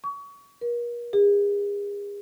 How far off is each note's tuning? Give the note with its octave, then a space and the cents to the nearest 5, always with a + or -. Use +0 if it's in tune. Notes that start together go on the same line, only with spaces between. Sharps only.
C#6 +30
A#4 +40
G#4 -40